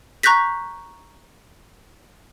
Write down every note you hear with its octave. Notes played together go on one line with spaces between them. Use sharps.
A#5 C#6 F#6 G6 A#6 B6